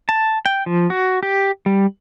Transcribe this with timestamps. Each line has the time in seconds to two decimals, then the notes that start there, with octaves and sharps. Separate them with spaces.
0.09 A5
0.46 G5
0.66 F3
0.90 F#4
1.23 G4
1.66 G3